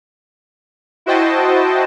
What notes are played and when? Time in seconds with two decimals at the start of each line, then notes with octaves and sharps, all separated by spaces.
1.06 E4 F#4 C5 D#5 G5 A5